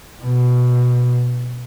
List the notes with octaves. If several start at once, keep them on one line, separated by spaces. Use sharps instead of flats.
B2